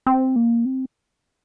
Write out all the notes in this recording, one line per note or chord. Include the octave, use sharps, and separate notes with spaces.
C4
A#3
C4